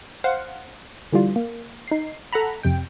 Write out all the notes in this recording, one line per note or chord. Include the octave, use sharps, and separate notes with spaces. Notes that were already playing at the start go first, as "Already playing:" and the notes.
C5 F5 F#5
D3 E3 G3 F4
A#3
D#4 C7
A4 F#5 A#5 B5
F2 C3 G5